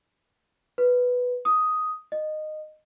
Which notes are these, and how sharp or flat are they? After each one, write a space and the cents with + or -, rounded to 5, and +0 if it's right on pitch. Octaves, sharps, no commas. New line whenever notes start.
B4 +0
D#6 +5
D#5 -15